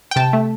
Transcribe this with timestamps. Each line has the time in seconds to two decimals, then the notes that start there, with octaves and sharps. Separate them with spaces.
0.11 G5
0.16 C3 A5
0.33 A3